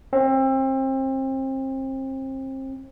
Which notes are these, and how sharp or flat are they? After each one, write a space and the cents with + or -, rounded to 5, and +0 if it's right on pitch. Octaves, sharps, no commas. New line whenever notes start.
C4 +30